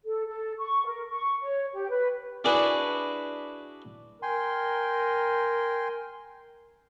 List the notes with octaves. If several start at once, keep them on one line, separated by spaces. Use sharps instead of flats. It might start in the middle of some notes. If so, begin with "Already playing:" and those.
A4
A4
C#6
A#4
C#6
C#5
G4
B4
D4 E4 F#4 G#4 B4
A#4 G5 G#5 C6